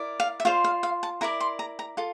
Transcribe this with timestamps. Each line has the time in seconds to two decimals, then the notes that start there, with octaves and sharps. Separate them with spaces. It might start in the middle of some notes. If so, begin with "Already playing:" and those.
Already playing: E4 A#4 D5
0.20 F5
0.40 E5
0.45 F4 C5 F5
0.64 F5
0.83 F5
1.03 A5
1.21 E4 A#4 D5 A#5
1.40 C6
1.59 A#5
1.79 A#5
1.97 F4 A4